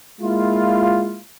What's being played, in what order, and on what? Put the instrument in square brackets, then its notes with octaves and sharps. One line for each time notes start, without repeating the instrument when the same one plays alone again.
[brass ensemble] G#3 A#3 E4 F4